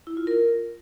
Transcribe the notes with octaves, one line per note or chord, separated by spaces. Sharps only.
E4
F4
A#4